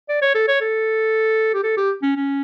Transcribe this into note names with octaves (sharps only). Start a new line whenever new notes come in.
D5
C#5
A4
C#5
A4
G4
A4
G4
C#4
C#4